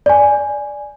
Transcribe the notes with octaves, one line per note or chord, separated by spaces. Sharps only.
D5 G#5